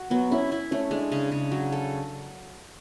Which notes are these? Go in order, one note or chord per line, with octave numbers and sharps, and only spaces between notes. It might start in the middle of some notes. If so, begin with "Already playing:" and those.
Already playing: F#4
F#3 B3
C#4 E4
E4
A3 C#4
G#3 D4
C#3
C#3
F#3
A4